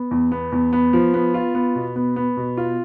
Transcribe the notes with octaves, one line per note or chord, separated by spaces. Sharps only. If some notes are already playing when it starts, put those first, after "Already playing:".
Already playing: B3
E2
B3
E2
B3
F3
B3
F4
B3
B2
B3
B3
B2
F4